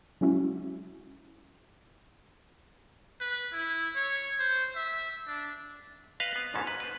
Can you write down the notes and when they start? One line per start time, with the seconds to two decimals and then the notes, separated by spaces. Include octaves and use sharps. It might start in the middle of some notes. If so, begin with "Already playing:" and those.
0.21 F#3 G#3 C#4 E4 F#4
3.21 B4
3.53 E4
3.96 C#5
4.39 C5
4.76 E5
5.27 D4
6.20 B4 D#5 F5
6.36 B3 C4
6.54 G#1 C#2 G#2 B2 C#4 A4
6.67 B4
6.80 B4 C5